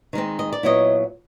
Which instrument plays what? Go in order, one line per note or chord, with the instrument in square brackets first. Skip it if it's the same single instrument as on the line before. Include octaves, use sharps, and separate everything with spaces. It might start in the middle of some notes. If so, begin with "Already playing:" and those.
[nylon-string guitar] D#3 G#3 C4
D#5
D5
A#2 F#3 B3 E4 C#5 D#5